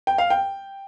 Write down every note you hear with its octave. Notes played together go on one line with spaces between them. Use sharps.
G5
F5
G5